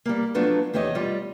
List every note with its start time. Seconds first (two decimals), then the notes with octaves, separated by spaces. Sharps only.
0.06 G3 A#3
0.34 F3 F#3 A3 B3 C4 D4
0.73 E2 A3 G4 C#5 D#5
0.95 G3 F4